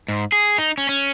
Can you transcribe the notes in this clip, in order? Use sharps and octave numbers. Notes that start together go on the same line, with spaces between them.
G#2
G#4
D#4
C#4
C#4